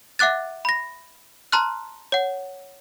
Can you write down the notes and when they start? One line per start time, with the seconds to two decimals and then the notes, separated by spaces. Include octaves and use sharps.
0.19 E5 F#5 D6 F#6 A6
0.65 B5 A#6
1.52 A5 A#5 C6 F6 F#6
2.12 C#5 F#5